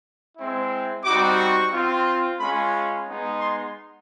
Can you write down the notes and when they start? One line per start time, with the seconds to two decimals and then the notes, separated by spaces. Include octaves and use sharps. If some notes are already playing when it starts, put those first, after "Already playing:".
0.36 G#3 C4 E4
1.04 G3 C4 D#4 F#4 D6
1.38 C#6
1.72 C4 F4
2.39 G#3 C#4 F4 B5
2.73 B5
3.07 G#3 B3 D#4
3.40 C6